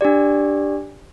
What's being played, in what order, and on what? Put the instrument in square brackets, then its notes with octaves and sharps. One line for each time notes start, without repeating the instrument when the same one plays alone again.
[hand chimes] D4 G4 D5